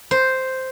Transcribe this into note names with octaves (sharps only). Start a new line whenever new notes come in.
C5